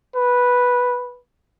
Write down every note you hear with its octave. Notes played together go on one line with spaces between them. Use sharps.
B4